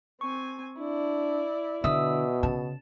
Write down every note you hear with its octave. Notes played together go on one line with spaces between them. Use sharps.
C4 G#5 C#6
D4 E4 D5
B2 D3 E5 D#6 E6
C#3 A5